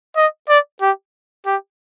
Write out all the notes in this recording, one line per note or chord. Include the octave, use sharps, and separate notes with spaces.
D#5
D5
G4
G4